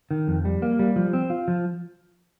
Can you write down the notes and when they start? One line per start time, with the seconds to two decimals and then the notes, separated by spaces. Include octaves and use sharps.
0.11 D#3
0.28 F2
0.45 G3
0.62 A#3
0.79 G3
0.96 F3
1.13 C4
1.30 F4
1.48 F3